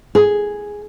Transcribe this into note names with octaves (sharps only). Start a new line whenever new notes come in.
G#4